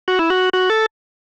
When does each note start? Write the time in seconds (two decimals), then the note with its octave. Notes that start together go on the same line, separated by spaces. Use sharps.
0.08 F#4
0.19 E4
0.30 F#4
0.53 F#4
0.70 A4